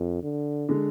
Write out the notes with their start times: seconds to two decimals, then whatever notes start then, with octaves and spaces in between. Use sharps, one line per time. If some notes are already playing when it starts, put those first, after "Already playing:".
Already playing: F2
0.23 D3
0.69 D3 G#3